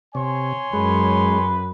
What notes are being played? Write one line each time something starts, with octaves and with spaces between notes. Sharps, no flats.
C3 C#5 G#5 C6
F#2 G#3 B4